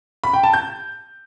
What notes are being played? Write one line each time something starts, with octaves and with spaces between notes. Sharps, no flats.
B5
G5
A5
G6